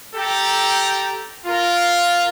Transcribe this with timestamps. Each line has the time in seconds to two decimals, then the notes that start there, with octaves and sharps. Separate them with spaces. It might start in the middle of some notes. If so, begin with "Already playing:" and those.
0.15 G4 A4 G5 A#5
1.46 F4 A#4